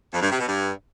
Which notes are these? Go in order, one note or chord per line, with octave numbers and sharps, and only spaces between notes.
F2
G2
C3
B2
G2